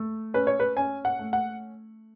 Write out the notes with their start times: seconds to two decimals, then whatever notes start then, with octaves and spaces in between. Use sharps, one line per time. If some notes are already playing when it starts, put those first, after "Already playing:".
Already playing: A3
0.34 C#4 B4
0.47 C#5
0.60 B4
0.76 C#4 G#5
1.05 F#5
1.19 A3
1.33 F#5